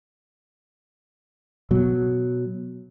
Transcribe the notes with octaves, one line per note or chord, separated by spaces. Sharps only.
B2 F#3